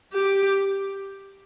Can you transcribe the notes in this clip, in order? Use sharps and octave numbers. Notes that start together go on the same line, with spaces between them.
G4